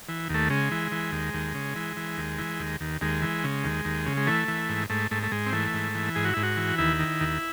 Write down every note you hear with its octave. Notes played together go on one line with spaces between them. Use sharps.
E3
D#2 A3
C#3 G#3
E3
E3
D#2
D#2
C#3
E3
E3
D#2
E3
D#2
D#2
D#2 G#3
E3
C#3
D#2
D#2
C#3
G#3
E3 A3
E3
G#2
G#2 A3
G#2 A3
A3
G#2 G#3
C4
E3 A3
G#2
E3
G#2 G#4
F#4
G#2 E4
F#4
E3
D#2 E4
D#3
D#2